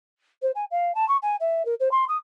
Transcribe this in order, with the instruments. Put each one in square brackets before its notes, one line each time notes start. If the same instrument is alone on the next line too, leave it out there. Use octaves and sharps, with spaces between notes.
[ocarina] C5
G#5
F5
A5
C#6
G#5
E5
A#4
C5
C6
D#6